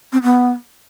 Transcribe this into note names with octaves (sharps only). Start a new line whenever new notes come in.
C4
B3